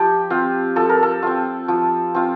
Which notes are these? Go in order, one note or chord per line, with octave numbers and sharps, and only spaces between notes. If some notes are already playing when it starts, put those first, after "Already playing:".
Already playing: F3 G4
C4 F4
F3 A4
A#4
A4
C4 F4
F3
C4 F4